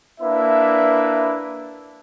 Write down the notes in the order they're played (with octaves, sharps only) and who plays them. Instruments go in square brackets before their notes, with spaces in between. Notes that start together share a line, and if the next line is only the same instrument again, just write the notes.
[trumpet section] A#3 D4 E4 B4 E5